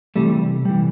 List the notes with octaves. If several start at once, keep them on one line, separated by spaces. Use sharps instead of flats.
C3 E3 G3 A3
C3 E3 G3